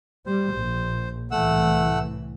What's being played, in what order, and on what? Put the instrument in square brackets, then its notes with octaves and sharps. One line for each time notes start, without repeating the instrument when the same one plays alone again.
[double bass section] G3 [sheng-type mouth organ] C5
[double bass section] A#1
[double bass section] C2 A2 E3 [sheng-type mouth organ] A3 F#5 E6